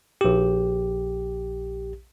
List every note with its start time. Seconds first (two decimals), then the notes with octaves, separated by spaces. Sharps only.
0.21 A#1 G4